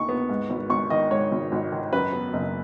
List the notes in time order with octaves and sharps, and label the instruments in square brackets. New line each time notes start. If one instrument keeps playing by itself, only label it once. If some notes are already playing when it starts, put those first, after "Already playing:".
Already playing: [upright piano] D#2 D#3 D#4 C#6
B3
G#2
G#1
G#1 C#6
D#3 D#5
G#2 C#5
G#1
G#1
D#3
F#2 B4
B3
F#1